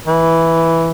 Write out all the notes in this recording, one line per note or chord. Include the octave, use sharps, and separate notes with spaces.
E3